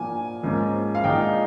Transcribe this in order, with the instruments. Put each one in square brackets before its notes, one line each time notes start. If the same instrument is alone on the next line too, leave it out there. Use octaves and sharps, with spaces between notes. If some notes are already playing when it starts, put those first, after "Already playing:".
Already playing: [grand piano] A#2 F3 A#3 [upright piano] G#5
[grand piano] G#2 F3 A#3 C#4
[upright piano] F5
[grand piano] A#2 F3 G#3 D#4 [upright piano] G5